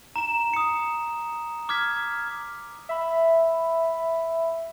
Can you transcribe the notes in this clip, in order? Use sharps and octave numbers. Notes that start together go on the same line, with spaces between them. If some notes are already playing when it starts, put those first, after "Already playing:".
A#5 E7
D#6 C#7
D6 F6 G#6 B6
E5 B5